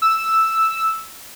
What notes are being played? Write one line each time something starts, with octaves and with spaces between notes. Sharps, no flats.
E6